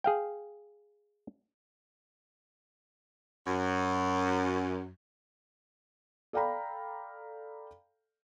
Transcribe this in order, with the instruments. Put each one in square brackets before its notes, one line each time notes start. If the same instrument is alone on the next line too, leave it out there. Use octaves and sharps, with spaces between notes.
[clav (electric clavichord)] G#4 F5 G5
[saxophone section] F#2
[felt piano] A4 D5 F5 G5 A#5 B5